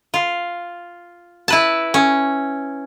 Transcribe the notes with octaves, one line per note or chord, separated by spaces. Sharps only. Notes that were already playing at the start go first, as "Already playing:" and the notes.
F4
E4 B4 A5
C#4